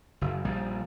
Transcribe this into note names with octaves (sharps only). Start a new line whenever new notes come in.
F#1
A#1 F3 G3